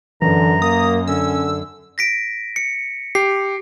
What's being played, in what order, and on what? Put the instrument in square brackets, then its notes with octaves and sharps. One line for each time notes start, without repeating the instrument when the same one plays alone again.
[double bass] F#2 [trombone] D3 [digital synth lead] E3 [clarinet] A#5
[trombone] A#3 [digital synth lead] D#6
[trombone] D3 [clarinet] C#4 [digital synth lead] E6
[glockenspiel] A#6 B6 D7
C#7
[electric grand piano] G4 [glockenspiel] C7